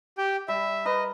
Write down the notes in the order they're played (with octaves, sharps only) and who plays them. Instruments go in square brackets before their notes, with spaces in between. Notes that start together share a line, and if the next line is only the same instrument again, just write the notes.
[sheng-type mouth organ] G4 G5
[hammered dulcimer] G3 [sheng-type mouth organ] E5
[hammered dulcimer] A#4 B4 [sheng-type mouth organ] D#5